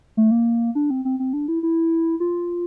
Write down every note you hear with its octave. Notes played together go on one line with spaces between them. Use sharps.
A3
A#3
D4
C4
C4
C4
D4
E4
E4
F4